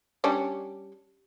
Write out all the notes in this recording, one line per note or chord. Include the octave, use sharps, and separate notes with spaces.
G3 C#4 D4